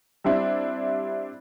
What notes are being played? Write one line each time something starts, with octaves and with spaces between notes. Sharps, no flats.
G3 C4 D4 E4